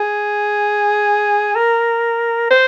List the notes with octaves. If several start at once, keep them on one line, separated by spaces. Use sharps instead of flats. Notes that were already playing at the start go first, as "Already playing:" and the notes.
Already playing: G#4
A#4
C5